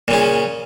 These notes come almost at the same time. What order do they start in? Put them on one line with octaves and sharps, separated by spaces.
A#2 C#3 C#4